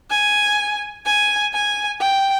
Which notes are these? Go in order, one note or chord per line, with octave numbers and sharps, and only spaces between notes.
G#5
G#5
G#5
G5